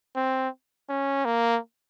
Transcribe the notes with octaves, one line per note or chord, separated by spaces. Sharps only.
C4
C#4
A#3